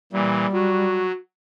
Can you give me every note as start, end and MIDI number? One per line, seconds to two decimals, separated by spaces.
0.13 0.46 46
0.13 0.46 52
0.13 1.08 55
0.52 1.12 54
0.52 1.17 66